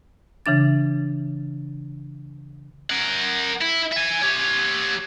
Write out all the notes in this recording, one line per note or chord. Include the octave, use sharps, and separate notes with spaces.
C#3 E3 D4 A6
A#4 F#5
E4
E5 G#5
G4 C#5